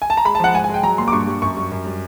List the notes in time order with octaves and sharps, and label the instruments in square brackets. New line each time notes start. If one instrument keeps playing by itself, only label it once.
[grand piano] G#5
A5
A#5
G#3 B5
A5
F3 F#5
G#2 G#5
G#5
G#3 G5
F#3 A#5
A#2 C6
D6
G2 C#6
G3
F#2 C#6
G3
F#2
G3